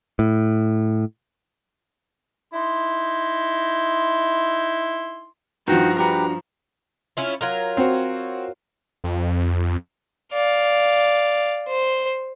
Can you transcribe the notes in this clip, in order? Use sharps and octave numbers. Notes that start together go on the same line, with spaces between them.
A2
D#4 E4 C6
G2 F3 D#4 F#4 G5 A#5
D4 F#4 G4 B4 A#5
C#4 E4 F4
F#3 F4 A#4
C4 F#4
F2
D5 F5
C5